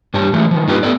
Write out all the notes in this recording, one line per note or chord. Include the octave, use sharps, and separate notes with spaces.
G2 G4 C#5 A5
E3 F3 G#3 A3
D#3 F3
G2 A#3 D#4 F4 G4 B4
A3 B3 A4 D5